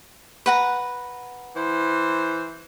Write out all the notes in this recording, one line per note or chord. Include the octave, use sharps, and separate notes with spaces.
B4 F#5 A#5
E3 C5